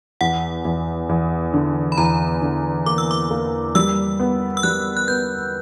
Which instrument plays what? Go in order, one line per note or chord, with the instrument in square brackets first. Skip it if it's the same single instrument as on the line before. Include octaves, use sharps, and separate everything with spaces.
[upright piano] E2 [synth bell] F#5
[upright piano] E2
E2
D3
[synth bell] B5
[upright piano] E2 [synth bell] A#5
[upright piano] D3
[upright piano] A#3 [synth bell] D6
[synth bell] E6
D6
[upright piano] A#3
[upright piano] G3 [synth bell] E6
[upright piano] B3
[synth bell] E6
[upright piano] G3 [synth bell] F#6
[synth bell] F#6
[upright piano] B3 [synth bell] G6